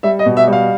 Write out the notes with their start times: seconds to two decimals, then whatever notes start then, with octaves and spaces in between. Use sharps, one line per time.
0.03 G3 E5
0.19 D#5
0.26 B2
0.37 E5
0.48 G3 F5